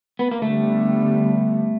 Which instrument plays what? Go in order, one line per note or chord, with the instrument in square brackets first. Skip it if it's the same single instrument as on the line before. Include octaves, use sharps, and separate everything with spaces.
[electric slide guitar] B3
A#3
[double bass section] D3 G3 B3 [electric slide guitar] A3